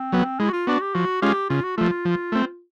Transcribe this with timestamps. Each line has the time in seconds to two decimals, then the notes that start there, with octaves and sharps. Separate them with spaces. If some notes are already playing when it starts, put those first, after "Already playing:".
Already playing: C4
0.12 F#3 B3
0.40 G#3 E4
0.49 F#4
0.53 F4
0.67 B3 D4 F#4
0.81 G4
0.94 F3 F#4
1.22 G#3 C#4 F4 G4
1.50 C#3 F4
1.64 F#4
1.77 F3 A3 F4
2.05 F3
2.32 A3 C4